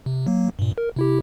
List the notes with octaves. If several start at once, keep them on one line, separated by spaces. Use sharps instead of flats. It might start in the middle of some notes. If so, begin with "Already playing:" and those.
C3
F#3 A#3
G2 A#2
A#4
C3 E4 G4